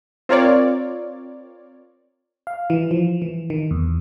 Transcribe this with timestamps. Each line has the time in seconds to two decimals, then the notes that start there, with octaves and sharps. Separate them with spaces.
0.29 C4 F4 A#4 C#5 D5
2.47 F5
2.70 E3
2.91 F3
3.22 E3
3.50 D#3
3.71 E2